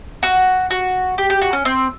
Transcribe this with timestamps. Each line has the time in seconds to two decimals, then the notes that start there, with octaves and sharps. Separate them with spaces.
0.23 F#4
0.71 F#4
1.18 G4
1.30 G4
1.42 F#4
1.53 C#4
1.65 C4